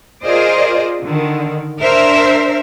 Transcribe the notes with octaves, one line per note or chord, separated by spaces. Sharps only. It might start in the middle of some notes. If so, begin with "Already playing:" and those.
F4 G#4 A#4 C5 D5 D#5
D3 D#3
D4 A#4 C5 E5